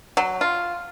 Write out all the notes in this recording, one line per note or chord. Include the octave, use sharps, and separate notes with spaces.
F#3
F4